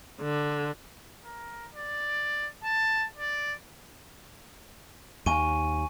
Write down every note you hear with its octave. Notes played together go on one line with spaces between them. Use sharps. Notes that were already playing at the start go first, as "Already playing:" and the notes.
D3
A#4
D5
A5
D5
D#2 G#5 C#6 D#7